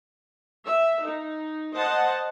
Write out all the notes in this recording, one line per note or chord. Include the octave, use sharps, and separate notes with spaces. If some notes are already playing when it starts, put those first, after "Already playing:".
E5
D#4
C5 D#5 F#5 A5